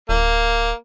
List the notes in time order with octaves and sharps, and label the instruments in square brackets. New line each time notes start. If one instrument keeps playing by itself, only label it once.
[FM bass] D1 [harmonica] A#3